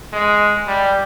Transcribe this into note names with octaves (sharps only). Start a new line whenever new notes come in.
G#3
G3